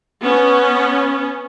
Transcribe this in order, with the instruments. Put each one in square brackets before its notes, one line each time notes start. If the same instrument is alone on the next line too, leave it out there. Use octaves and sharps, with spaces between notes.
[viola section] B3 C#4